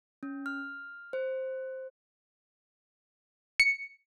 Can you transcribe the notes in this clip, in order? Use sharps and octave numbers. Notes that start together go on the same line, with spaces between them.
C#4
F6
C5
C#7